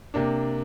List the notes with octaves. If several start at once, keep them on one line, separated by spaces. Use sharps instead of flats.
C3 A#3 D4